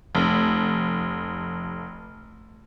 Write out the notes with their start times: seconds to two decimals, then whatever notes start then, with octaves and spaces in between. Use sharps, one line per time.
0.15 F1 A3